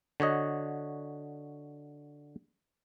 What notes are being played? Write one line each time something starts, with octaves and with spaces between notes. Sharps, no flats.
D3 F#4 C#5 D#5